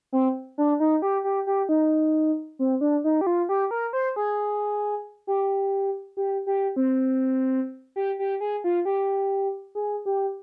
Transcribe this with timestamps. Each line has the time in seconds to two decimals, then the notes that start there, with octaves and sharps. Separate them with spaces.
0.12 C4
0.58 D4
0.80 D#4
1.02 G4
1.24 G4
1.47 G4
1.69 D#4
2.59 C4
2.81 D4
3.04 D#4
3.21 G4
3.27 F4
3.49 G4
3.71 A#4
3.93 C5
4.16 G#4
5.27 G4
6.17 G4
6.47 G4
6.76 C4
7.96 G4
8.19 G4
8.41 G#4
8.64 F4
8.85 G4
9.75 G#4
10.06 G4